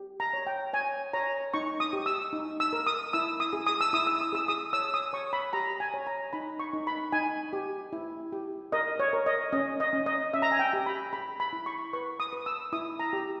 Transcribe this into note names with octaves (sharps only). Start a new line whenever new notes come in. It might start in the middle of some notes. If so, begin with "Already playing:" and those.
Already playing: G4
A#5
C#5
G5
C#5 G#5
C#5 A#5
D#4 C#6
D#6
G4
E6
D#4
E6
A#4
D#6
E4 E6
D#6
G#4
D#6
E6
E4 D#6
E6
D#6
G#4 E6
D#6
C#5 E6
D#6
C#5 C#6
B5
G4 A#5
G#5
C#5
A#5
D#4 B5
C#6
D#4
B5
D#4 G#5
G4
E4
G4
A#4 D#5
C#5
A#4
D#5
C#4 D#5
D#5
C#4
D#5
C#4 E5
A#5
G#5
G5
G4
B5
G#4 B5
B5
E4
C#6
B4 C#6
D#6
B4
E6
E4 D#6
A#5
G4